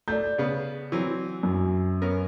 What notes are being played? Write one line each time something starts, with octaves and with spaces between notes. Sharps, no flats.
A3 D5 G6
C#3 B3
E3 F#3 C4
F#2
B3 C#4 A#4